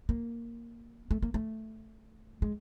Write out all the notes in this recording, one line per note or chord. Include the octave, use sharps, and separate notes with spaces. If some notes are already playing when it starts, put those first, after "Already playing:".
A#3
A3
A#3
A3
G#3